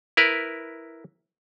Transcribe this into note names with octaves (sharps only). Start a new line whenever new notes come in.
E4 A#4 B4